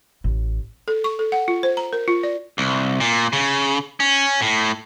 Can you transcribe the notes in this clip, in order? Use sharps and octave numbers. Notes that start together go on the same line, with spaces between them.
A1
A4
C#6
A4
F#5
F4
C5
A#5
A#4
F4
D5
C2
A#2
C#3
C#4
A2